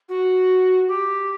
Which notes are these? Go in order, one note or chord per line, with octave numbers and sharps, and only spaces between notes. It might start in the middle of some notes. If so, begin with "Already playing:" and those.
F#4
G4